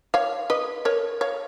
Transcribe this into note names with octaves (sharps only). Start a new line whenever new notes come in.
C#5 F5
B4 D#5
A#4 C#5
C#5 F5